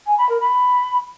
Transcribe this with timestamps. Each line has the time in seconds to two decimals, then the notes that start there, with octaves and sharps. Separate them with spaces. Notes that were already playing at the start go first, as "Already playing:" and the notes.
0.07 G#5
0.18 B5
0.29 A#4
0.40 B5